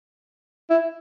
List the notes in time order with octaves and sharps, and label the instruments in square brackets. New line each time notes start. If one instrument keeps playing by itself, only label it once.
[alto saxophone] E4